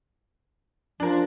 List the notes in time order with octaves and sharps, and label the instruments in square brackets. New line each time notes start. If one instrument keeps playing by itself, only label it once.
[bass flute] F3 [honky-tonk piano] D4 A#4